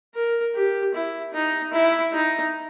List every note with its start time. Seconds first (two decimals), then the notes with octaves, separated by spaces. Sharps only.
0.14 A#4
0.55 G4
0.94 E4
1.34 D#4
1.73 E4
2.13 D#4